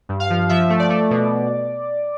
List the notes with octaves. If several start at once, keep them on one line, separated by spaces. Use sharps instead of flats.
G2
F5
F3
F3 E5
A3
D5
A3
B2